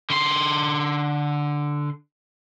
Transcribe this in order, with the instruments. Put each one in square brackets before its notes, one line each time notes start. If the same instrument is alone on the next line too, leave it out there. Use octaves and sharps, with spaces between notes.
[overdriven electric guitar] D3 C6